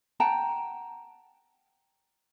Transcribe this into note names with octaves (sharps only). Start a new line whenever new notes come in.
F#5 G5 A5 A#5